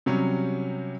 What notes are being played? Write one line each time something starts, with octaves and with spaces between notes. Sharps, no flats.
C3 F#3 G3 C#4